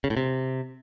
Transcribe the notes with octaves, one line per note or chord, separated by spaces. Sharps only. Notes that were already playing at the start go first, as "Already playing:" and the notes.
C#3
A2
C3